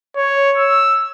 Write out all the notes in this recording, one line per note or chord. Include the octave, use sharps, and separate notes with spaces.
C#5
E6